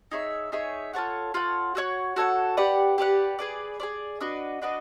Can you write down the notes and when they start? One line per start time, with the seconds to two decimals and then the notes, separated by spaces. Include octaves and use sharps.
0.12 D#4 G#4 C#5 E5
0.52 D#4 G#4 C#5 E5
0.94 F4 A4 C#5 F#5
1.34 F4 A4 C#5 F#5
1.75 F#4 A4 C#5 F#5
2.16 F#4 A4 C#5 F#5
2.57 G4 B4 D5 F#5
2.98 G4 B4 D5 F#5
3.39 G#4 B4 D5
3.80 G#4 B4 D5
4.21 D4 F#4 B4 D#5
4.62 D4 F#4 B4 D#5